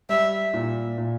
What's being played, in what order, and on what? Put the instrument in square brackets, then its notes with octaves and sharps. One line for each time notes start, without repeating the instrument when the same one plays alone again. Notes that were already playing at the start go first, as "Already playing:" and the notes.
[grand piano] G3 [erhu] E5
[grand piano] A#2
A#2